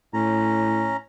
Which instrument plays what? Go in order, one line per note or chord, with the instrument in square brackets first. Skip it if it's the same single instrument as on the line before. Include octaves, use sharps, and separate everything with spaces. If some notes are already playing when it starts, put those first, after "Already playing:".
[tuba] A2 [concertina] C#4 A#5